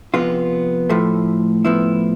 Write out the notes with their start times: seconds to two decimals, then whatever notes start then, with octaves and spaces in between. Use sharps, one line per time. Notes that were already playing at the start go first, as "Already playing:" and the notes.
0.14 F2 C3 G#3 B3 F4
0.90 A2 F3 A3
1.65 A2 F3 B3 E4